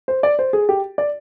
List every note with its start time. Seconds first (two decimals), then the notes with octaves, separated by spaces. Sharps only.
0.08 C5
0.23 D5
0.39 C5
0.53 G#4
0.69 G4
0.98 D5